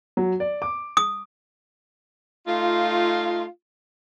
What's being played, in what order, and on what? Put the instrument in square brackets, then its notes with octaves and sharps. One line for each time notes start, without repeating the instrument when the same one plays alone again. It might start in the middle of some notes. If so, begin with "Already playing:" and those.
[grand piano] F#3
D5
D6
[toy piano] D#6
[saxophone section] A3 D#4 F4